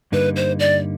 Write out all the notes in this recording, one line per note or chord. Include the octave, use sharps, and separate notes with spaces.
G2 D3 G3 A#3 D#4 B4
C5
D5